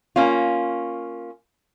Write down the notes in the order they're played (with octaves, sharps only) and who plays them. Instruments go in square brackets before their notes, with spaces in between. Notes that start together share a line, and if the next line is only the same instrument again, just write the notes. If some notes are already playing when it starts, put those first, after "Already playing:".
[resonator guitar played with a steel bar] A#3 C#4 F4